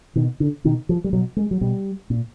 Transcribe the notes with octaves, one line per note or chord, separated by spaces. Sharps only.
B2 D#3
D3
B2 D#3
F3
G3
B2 F#3
G#3
F#3
B2 G3
A#2